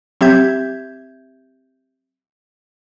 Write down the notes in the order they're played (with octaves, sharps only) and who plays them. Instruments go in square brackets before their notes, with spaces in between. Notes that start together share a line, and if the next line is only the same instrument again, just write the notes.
[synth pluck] F#3 C4 G4 E5 G6 G#6